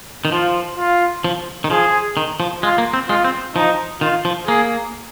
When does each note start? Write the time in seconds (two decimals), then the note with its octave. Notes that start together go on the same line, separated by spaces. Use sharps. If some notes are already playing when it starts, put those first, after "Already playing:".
0.25 D#3
0.32 F3 F4
0.77 F4
1.24 F3
1.64 D#3
1.70 F3 G#4
2.17 D#3
2.40 F3
2.63 G#3 F4
2.78 A#3
2.93 C4
3.09 G#3 F4
3.24 C4
3.56 F3 D#4
4.01 D#3 F4
4.25 F3
4.47 A#3 G#4